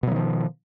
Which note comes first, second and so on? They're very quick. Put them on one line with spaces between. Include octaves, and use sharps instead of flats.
B2 F#3 D#3 F3